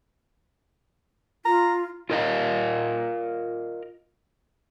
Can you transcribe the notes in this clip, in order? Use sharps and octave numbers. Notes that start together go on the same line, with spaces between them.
F4 A#5
F4 A#4 D#5 F5